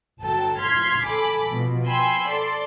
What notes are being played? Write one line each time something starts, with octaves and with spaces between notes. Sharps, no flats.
G1 F#3 A4 G5 A5
C6 F6 G#6 B6 C7
A4 G#5 B5 D6
B2 F3
G5 G#5 B5 C6 E6
A4 D5 C6